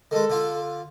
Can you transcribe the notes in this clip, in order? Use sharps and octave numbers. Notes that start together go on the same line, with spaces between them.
D#3 G#3 A4
D3 F4